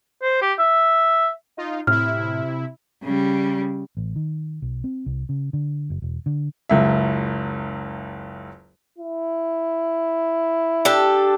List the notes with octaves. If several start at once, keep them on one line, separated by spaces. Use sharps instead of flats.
C5
G4
E5
D#4 F4
A2 C3 E4 F6
C#3 G3
A1
D#3
B1
C4
C2
C#3
D3
F#1
E1
D3
F#1 C#2 E5
E4
D4 G4 A4